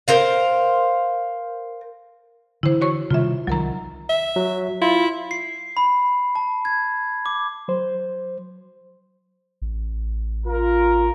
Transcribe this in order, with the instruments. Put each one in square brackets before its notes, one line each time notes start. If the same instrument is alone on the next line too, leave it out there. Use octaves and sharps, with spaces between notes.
[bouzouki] A#4 C5 F5
[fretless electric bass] D3 E3 [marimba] E4 C5
[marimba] F#4 C#5 C#6
[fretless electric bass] C3 D#3 G3 [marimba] F4 E5
[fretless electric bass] C2 D#3 [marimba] F#3 A#4 A#5
[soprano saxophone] E5
[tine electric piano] F#3
[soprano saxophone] E4 [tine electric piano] F4
[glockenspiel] C7
B5
A5
G#6
D6
[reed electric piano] F#3 C5
[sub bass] A1
[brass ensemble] F4 A#4